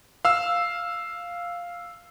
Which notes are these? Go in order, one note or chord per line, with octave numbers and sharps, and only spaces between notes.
F5 E6